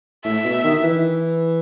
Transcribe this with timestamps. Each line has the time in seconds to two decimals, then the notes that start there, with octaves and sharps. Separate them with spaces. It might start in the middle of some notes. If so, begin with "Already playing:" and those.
0.25 A2 E5
0.45 B2
0.64 D#3
0.83 E3